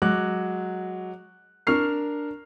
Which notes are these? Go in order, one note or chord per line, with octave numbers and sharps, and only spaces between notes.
F#3 G#3 D6 F#6
D4 A#4 C#6 F6 C7